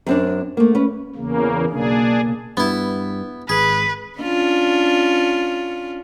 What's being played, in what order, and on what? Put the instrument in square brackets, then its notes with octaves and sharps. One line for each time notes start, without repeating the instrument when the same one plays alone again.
[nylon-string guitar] F#2 C4 D4
A3 A#3
C#4 B4
[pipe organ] E2 C#3 A#3
[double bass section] B1 C#3 A#3 [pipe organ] D4 G#4
[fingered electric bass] G2 [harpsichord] B3 E4
[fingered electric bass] G#1 [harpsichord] G#4 [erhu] B4
[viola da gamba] C#4 D4 F4